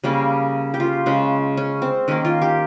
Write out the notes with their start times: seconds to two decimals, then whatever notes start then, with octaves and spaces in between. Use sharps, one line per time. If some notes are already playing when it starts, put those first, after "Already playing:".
0.04 C#3 G3 A#3
0.74 G4
0.80 F4
1.06 C#3 G#3
1.57 C#4
1.82 C4
2.08 D#3 A#3 C#4
2.25 F4
2.42 G4